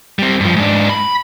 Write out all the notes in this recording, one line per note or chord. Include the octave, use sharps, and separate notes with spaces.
G3 C4
G2 F3
G#2 D4
B5